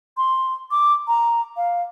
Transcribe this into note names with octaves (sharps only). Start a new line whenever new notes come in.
C6
D6
A#5
F5